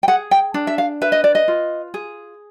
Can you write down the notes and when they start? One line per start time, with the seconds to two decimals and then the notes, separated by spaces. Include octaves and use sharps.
0.03 G5
0.08 G#4 F#5
0.31 G5
0.54 D4
0.67 E5
0.78 F5
1.02 B4 E5
1.12 D#5
1.24 D5
1.35 D#5
1.48 F4
1.94 G#4